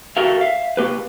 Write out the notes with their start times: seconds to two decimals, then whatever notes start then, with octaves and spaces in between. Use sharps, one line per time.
0.17 F#4 G4 A4 A#4 E5 F5
0.41 E5 F5
0.77 A#3 G4 B4